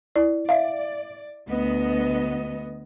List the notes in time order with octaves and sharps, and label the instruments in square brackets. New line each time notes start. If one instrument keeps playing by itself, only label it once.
[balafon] E4 D5
[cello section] D5 [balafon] E5 F5
[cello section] D2 B3 D#5